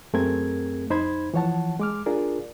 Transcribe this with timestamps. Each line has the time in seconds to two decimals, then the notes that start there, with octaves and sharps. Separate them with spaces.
0.13 F#2 A3 C4 G#4 A#4 G#6
0.90 F2 D#4 C5 B5 G#6
1.34 E3 F3 C#5 F#5 A5
1.80 G#3 D6 F6
2.06 D4 F4 G#4 A#4 D5